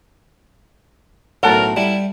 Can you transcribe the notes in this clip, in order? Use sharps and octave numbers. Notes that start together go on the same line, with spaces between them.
B1 A2 A#4 F#5 A5 A#5
G3 E4